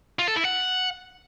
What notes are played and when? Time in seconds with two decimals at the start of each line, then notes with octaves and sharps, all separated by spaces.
0.19 F4
0.28 A4
0.36 E4
0.45 F#5